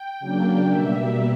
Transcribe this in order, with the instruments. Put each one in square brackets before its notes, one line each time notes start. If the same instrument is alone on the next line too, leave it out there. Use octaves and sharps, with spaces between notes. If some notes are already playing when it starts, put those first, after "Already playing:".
Already playing: [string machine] G5
C#3 F#3 A#3 D4
B2 G3 A#3 E5